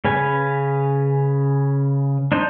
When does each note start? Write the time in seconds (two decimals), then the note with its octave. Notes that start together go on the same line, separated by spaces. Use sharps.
0.05 C#3 C#4 B4 G#5
2.32 D4 D#4 C5